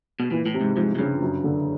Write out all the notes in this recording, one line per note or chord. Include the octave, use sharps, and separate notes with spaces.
B2
A#2 E3
A2
C3
G#2
G#2 F3
G#2
G2 C#3
F#2
D3